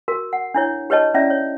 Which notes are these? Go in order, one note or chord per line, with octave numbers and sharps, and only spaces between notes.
F#4 A#4
F#5
D4 E4 C#5
G4 B4 C#5 D#5 A5
C#4 E4 D5 E5
C#5